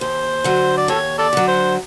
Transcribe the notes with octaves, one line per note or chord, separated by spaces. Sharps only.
D#2 C5
D3 F#3
D5
D#2 A4 C#5
A4 D5
D3 F#3
C5